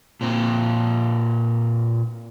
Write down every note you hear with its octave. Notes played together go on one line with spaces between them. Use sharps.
A#2 C4